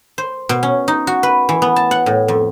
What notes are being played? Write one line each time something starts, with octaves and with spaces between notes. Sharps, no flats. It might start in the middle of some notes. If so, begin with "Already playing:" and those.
C5
B2
C#4
D#4
F#4
B4
E3
B3
A5
F#5
A2
F2